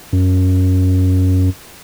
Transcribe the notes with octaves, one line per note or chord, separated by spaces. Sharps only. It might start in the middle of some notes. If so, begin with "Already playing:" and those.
F#2